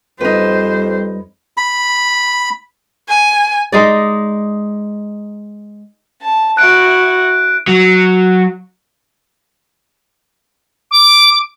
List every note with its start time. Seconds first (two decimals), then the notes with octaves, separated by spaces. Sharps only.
0.21 F2 G3 D#4 B4 C5
1.57 B5
3.08 G#5
3.72 G#3 D#4 D5
6.22 A5
6.57 E4 F#4 F#6 D7
7.67 F#3
10.91 D6